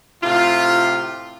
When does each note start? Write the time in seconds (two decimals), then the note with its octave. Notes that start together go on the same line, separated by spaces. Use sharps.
0.23 A2 C3 F4